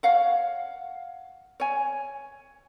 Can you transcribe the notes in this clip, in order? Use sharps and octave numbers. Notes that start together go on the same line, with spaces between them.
C#5 F5 F#5
C#5 G#5